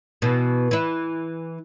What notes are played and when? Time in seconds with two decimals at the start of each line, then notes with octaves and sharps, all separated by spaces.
0.22 B2 E3
0.71 E3 E4